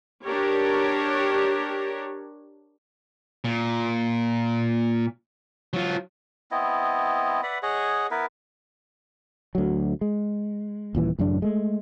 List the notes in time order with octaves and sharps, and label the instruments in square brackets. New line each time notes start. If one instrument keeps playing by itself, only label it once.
[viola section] D4 G4 A#4 C#5
[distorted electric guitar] A#2
F#3 F4
[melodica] B3 C4 E4 D#5
B4 D5 E5 F#5
G#4 C#5 D#5 F#5
B3 E4 A#4 B4
[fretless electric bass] D2 F#3
G#3
D#1 A#2 E3
A1 F#2 C#3 D4
G#3 A3